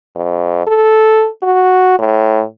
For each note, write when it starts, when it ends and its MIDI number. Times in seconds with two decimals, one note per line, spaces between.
0.16 0.62 41
0.67 1.28 69
1.43 1.96 66
1.99 2.43 45